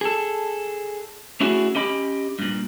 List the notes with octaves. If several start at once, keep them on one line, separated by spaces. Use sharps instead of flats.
G#4 A4
A3 C#4 E4 F#4 G#4
C#4 G4 D#5 B5
G2 A#2